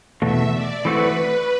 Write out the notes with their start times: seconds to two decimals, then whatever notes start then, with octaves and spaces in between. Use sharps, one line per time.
0.22 E2 B2 A3 F#4 E5
0.53 D5
0.84 E3 A3 C4 F#4 B4